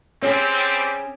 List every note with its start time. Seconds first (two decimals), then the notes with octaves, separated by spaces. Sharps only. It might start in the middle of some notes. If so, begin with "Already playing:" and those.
0.22 G3 C4 C#4 G#4